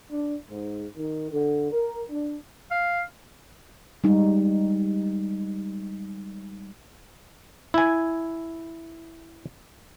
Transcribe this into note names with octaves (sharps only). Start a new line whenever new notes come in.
D4
G#2
D#3
D3
A#4
D4
F5
G3 G#3 D#4
E4 G#5